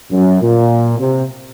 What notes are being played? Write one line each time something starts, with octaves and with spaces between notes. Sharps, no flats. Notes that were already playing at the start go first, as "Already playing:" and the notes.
F#2
A#2
C3